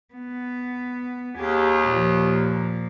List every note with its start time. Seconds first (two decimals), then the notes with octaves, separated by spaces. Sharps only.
0.14 B3
1.38 D#2 G4 G#4
1.89 A#2 F3